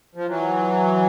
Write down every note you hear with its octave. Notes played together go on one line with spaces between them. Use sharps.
F3
E3 F#3